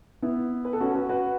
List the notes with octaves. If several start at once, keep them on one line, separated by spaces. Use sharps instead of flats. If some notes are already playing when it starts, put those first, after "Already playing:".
B3 E4
B4
A4
C#4 F#4
F#4 B4
F#4 B4